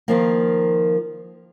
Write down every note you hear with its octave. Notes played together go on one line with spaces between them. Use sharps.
D#3 F3 A#3